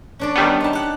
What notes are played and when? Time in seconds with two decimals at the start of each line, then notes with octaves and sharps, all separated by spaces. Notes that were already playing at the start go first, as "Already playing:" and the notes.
0.19 C#4 D4 D5
0.35 D#3 G3 B3
0.60 D#4 A5
0.73 G4 F#5